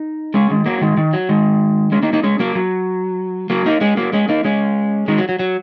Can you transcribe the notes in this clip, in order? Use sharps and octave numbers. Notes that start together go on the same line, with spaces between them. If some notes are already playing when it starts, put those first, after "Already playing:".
Already playing: D#4
G#3 C#4
D#3 G#3
F#3 A#3
D#3 G#3
D#3
F#3
D#3 G#3
G#3 C#4
A#3 D#4
A#3 D#4
G#3 C#4
F#3 A#3
F#3
F#3 A#3
A#3 D#4
G#3 C#4
F#3 A#3
G#3 C#4
A#3 D#4
G#3 C#4
D#3 G#3
F#3
F#3
F#3